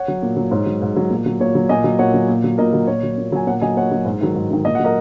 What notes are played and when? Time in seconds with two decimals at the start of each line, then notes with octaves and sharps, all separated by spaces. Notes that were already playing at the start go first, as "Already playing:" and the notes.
Already playing: C#5 F#5
0.08 F#3
0.22 A#2
0.37 F#3
0.51 G#2 C#5
0.66 F#3
0.82 G#2
0.96 F#3
1.10 A#2
1.26 F#3
1.40 A#2 C#5
1.55 F#3
1.69 A#2 D#5 G#5
1.84 F#3
1.99 A#2 C#5 F#5
2.14 F#3
2.28 A#2
2.44 F#3
2.58 A#2 A#4 D#5
2.74 F#3
2.87 A#2 C#5
3.03 F#3
3.18 A#2
3.32 F#3 G#5
3.47 A#2 C#5 F#5
3.61 F#3 D#5 G#5
3.76 A#2 C#5 F#5
3.91 F#3
4.05 G#2
4.21 D#3 F#3
4.35 G#2
4.51 D#3 F#3
4.65 A#2 D#5
4.75 F#3 F#5
4.85 A#4 D#5